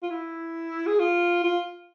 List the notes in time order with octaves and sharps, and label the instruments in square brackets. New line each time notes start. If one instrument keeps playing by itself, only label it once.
[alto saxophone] F4
E4
G#4
F4
F4